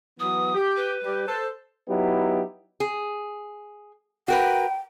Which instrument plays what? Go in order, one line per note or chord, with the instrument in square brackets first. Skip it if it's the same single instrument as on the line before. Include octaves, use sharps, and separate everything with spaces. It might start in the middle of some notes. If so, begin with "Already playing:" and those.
[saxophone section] E3 F#3 B3 [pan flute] D#6
[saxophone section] G4
[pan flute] B4
[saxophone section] G3 G4
A4 C5
[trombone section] F#3 B3 D#4 E4 G4
[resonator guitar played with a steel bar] G#4
[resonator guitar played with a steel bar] F#4 A#4 B4 [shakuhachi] G5